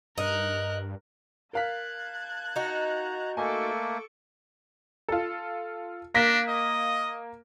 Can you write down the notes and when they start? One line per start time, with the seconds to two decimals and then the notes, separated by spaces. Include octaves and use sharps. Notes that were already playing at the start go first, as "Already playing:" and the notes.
0.18 G2 D#4 A#4 F#6
1.53 A#4 F5 A5 F#6 G#6 B6
2.56 D#4 F#4 A#5
3.37 A3 A#3 A4 D#5 G#5 C#6 D6
5.08 F4 A4
6.14 A#3 D4 A#6 B6
6.48 D#5